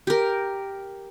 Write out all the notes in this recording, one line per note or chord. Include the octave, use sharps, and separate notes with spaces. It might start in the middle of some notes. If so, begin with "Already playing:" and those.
G4 A#4